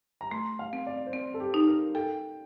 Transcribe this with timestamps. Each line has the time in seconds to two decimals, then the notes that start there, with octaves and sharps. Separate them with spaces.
0.21 A#5
0.31 A3 C6
0.59 F5
0.73 C4
0.87 D5
1.06 C5
1.13 C4 D5
1.34 A4
1.40 G4
1.54 D#4
1.67 A#4
1.95 A4 G5